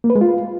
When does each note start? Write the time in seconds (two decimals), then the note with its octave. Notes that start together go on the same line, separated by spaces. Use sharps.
0.04 A#3
0.10 B4
0.16 G#3
0.21 F4